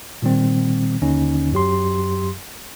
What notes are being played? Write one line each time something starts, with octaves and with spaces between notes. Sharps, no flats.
A#2 D#3 G3 C4
D#2 D3 C#4 D#4
F#2 F#3 G4 C6